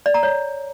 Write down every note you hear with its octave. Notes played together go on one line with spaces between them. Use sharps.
D5
A#5
C#5